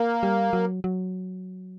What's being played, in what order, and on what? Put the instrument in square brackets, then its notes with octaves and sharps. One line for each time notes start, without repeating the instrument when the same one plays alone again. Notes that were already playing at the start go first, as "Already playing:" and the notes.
Already playing: [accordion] A#3
[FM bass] G3
F#3
F#3